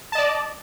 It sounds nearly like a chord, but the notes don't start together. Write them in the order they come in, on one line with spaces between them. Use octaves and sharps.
A5 D#5 D5